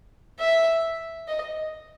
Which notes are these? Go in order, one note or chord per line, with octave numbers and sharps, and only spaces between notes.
E5
D#5